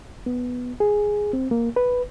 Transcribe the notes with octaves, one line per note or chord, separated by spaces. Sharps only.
B3
G#4
C4
A#3
B4